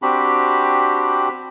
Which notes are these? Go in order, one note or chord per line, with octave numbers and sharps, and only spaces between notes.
C4 D4 F#4 G4 B5